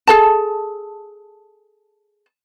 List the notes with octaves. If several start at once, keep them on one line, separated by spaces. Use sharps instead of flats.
G#4 A4 A5